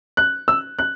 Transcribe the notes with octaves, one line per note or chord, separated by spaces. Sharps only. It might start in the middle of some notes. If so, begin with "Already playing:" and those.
F#6
E6
F#6